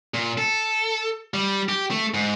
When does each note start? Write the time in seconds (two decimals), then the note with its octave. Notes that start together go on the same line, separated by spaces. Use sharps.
0.14 A#2
0.38 A4
1.34 G3
1.69 G4
1.91 A3
2.14 G#2